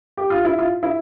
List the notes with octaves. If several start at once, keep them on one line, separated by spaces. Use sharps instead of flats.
G4
F4
E4
F4
E4